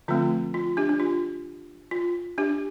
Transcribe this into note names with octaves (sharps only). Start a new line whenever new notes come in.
D3 F3 A3 C4 F4
F4
D4 G4
D4
F4
F4
D4 G4